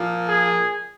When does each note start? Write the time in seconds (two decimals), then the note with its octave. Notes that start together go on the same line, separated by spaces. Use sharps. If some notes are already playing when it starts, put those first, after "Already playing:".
Already playing: A#2 F3 A#3
0.28 G#4